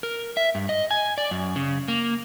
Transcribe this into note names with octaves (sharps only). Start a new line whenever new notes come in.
A#4
E5
G2
D#5
G#5
D5
F#2
C#3
A#3